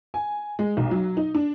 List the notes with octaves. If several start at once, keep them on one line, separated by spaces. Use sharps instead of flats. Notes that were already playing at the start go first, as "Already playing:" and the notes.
G#5
G#3
B1
F#3
D#4
D4